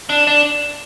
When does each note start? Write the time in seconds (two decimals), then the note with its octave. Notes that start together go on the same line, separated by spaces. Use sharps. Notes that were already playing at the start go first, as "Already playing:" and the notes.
0.09 D4
0.27 D4